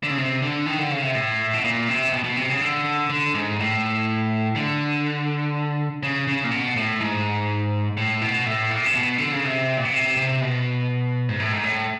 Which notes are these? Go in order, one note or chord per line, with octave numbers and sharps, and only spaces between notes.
D3
C#3
C3
D3
D#3
D3
C#3
C3
A2
B2
A#2
C3
B2
B2
C3
C#3
D3
D3
G#2
A2
D3
C#3
C#3
A#2
B2
A2
G#2
A2
B2
A2
A#2
C3
B2
D3
C#3
C3
A#2
B2
C3
C3
B2
G#2
A2
G#2
A2